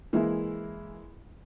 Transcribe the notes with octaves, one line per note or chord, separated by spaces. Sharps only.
E3 G#3 A#3 E4